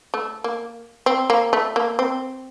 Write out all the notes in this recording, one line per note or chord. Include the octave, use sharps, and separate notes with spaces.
A3
A#3
C4
A#3
A3
A#3
C4